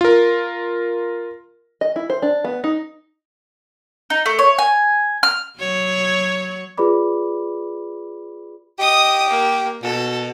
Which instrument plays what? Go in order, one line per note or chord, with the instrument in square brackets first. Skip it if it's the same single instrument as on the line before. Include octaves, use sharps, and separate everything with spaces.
[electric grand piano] F4 A#4
[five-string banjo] D#5
E4
C5
D4
B3
D#4
[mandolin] D#4
A3
C#5
G#5
F6
[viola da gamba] F#3 F#4 C#5
[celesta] F4 G#4 B4 D5 B5 D6
[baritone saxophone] G4 [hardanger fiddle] D#5 D#6
[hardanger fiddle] A#3
[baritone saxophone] B2 [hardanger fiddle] A4